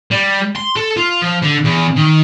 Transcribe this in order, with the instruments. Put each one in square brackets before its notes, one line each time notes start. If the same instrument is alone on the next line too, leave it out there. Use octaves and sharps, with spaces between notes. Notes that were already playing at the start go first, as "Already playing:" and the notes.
[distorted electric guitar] G3
C6
A4
F4
F3
D3
E2
D#3